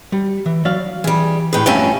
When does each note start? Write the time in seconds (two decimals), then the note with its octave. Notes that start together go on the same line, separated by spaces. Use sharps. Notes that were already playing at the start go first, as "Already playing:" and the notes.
0.12 G3
0.46 E3
0.65 F#3 D5 F5
1.04 E3 G3 G#4
1.53 A2 G#4 B4 G5
1.66 G2 F3 A3 C#4 E5 G5